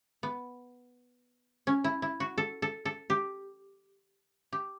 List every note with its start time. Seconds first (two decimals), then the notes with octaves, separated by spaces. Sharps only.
0.23 B3
1.67 C#4
1.84 E4
2.02 E4
2.20 F#4
2.38 A4
2.62 A4
2.85 A4
3.10 G4
4.52 G4